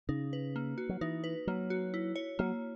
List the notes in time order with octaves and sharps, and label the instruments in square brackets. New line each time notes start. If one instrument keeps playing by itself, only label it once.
[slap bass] C#3 [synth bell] D#4
[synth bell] B4
A#3
F#4
[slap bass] F#3
[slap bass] E3 [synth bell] D#4
[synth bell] B4
[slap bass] F#3 [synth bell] A#3
[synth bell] F#4
E4
C#5
[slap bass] F#3 [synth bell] A#3